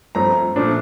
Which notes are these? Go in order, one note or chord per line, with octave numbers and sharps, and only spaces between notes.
G2 F3 A3 C4 A#5
A#2 F3 A3 D4